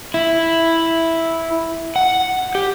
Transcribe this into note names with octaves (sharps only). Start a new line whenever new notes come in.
E4
F#5
G4